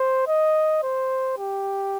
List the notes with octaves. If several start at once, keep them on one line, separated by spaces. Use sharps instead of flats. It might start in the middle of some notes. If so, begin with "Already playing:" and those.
Already playing: C5
D#5
C5
G4